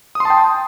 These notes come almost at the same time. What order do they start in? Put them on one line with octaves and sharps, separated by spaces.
D#6 C6 A5 G5